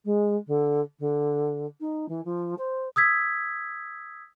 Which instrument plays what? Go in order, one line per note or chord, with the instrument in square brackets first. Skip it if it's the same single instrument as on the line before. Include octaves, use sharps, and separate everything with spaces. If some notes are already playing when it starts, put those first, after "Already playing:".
[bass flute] G#3
D3
D3
D#4
E3
F3
C5
[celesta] D#6 E6 G#6 B6